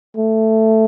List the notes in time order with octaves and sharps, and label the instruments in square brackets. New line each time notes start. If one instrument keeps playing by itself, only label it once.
[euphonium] A3